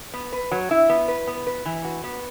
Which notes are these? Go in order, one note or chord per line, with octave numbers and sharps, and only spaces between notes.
B3
B4
F#3
E4
B3
B4
B3
B4
E3
F#4
B3